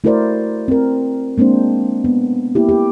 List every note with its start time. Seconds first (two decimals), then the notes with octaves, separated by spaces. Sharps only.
0.04 A3 E4 F#4 A#4 C5 D5
0.68 C4 A#4
1.38 G#3 A#3 C4 D4 C5
2.04 B3
2.55 A#3 E4 G4
2.69 G4